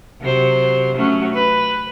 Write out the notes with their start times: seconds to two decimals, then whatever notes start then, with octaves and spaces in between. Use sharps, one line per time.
0.20 C3 F#3 C5
0.96 F#3 A3 C#4
1.33 B4